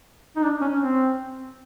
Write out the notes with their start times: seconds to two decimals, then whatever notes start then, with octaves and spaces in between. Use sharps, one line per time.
0.36 D#4
0.43 D4
0.61 C#4
0.80 C4